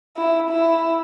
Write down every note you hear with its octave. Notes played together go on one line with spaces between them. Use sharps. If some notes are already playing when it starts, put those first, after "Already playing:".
E4
E4